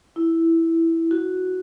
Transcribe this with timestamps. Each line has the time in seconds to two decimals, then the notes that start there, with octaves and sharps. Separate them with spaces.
0.16 E4
1.11 F#4